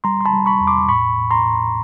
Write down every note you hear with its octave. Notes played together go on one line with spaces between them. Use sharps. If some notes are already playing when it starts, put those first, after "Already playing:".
G3 A#5 C6
C6
A5 B5
G3
B5 C#6
E2
C6 D6
A2 B5 C#6
A2
A#5 C6
A2